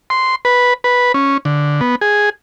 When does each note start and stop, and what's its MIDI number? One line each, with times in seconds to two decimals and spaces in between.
0.10 0.35 84
0.45 0.74 71
0.84 1.12 71
1.14 1.37 61
1.45 1.81 50
1.81 1.95 59
2.01 2.30 68